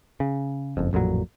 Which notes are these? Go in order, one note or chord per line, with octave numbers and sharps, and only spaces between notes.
C#3
F#1 F2
A1 F2 A#2 F#3